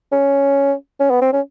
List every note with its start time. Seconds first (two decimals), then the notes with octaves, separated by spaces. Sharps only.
0.12 C#4
1.00 C#4
1.11 B3
1.22 C4
1.33 C#4